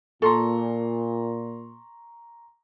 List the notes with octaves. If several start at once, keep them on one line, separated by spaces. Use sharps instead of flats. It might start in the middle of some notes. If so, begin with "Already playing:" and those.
A#2 A4 A#5 C6 C#6